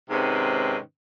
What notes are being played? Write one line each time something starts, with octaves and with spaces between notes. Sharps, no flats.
G#2 C3 D#3 C4 C#4 B4